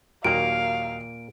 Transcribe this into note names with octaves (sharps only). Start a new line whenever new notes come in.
D#2 A#2 D#3 F#3 A#3 F5 D7